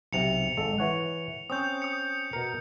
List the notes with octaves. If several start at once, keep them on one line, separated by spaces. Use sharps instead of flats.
B1 C3 C#7 F7
G#1 G#3 A4
E3 C#5 F#5
C4 C#4 D#6 G6
D#6 C#7
B2 A#4 C#7